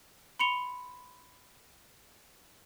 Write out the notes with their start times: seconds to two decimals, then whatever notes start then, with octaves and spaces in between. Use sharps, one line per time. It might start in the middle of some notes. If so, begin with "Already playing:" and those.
0.39 B5 C6 C#7 F7 G7